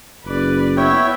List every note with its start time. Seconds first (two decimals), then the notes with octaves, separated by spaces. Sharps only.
0.25 F#1 B4 D5
0.77 B3 E4 C#5 E5 G5